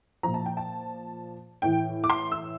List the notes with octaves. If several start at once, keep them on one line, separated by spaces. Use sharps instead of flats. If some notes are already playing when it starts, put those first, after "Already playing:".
A#2 F3 A#5
A5
G5
A5
A2 E3 G5
D6
C6
E6